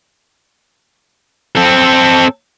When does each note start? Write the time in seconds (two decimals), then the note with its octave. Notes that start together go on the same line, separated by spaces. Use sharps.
1.55 C4 A4